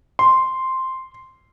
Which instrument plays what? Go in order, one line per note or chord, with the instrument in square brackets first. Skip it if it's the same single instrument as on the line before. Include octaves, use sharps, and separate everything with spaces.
[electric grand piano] C6